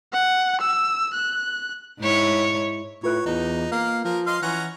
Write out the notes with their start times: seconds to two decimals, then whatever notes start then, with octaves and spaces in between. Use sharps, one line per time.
0.13 F#5
0.61 E6
1.14 F#6
2.00 G#2 E4 C#5
3.03 A2 F4 B4 C#5 F#6
3.26 E2 D#4
3.72 A#3 F5
4.05 F3 A#4
4.27 D#5 F5 C6
4.42 E3 C#4 F#5 A#5